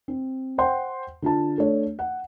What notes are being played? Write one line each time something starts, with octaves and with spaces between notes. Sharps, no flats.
C4
C5 F#5 G5 C6
D3 F4 A5
A3 D4 C#5
F#5